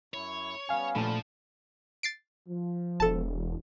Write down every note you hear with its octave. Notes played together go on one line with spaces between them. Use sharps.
F#2 E4 C#5
G3 B3 C#4 F5 G#5
A#2 F3 A3 D4 A5 B5
A6 C7 D7
F3
E1 A4 A5